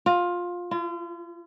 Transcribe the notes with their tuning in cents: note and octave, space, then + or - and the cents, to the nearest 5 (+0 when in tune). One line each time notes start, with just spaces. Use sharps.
F4 +15
F4 -40